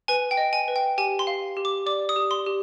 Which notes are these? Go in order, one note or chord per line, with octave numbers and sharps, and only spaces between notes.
B4 G#5
G5
D#5
G#5
B4
G5
G4 G#5
C6
F5
G4
D6
D5 D6
D#6
G4
C6
G4